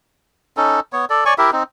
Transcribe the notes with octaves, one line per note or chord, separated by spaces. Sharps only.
C#4 D#4 A4
B3 C#5
A4 D5
C#5 D5 G#5 C#6
E4 G4 A#4 E5
C4 D#4